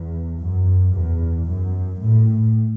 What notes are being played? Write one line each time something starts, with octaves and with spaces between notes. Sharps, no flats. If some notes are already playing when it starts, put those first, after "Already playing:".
Already playing: E2
F#2
E2
F#2
A2